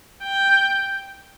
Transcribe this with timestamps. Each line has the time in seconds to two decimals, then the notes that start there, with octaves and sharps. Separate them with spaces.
0.23 G5